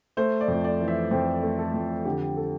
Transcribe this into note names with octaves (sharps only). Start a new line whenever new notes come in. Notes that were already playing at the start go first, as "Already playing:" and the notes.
A3 C5
D5
F2
D5
E3
E5
F2 C5
A3
A4
F2
D3 G4
A4